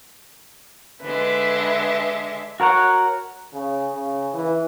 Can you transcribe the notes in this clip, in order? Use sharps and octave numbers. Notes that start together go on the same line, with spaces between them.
D3 G#3 B4 E5
F#4 A#4 C#5 F#5
C#3
C#3
E3